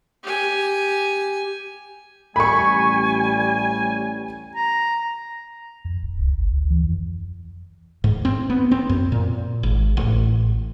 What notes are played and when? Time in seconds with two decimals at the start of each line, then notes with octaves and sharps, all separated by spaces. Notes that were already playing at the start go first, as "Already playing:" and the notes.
0.23 G4 G#5
2.36 A1 G3 G#5 B5 C#6
4.55 A#5
5.85 F2
6.03 D1
6.19 C#2
6.37 G1
6.51 D2
6.70 E3
6.83 F2
8.04 G#2
8.25 C4
8.50 B3
8.71 C4
8.90 F#2
9.12 A#2
9.63 G#1
9.97 A1